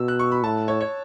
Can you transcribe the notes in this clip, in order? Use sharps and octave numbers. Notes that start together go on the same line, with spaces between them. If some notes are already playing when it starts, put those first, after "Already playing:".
Already playing: B2 E6
F#6
C#6
B5
A2 A5
C#5
C#5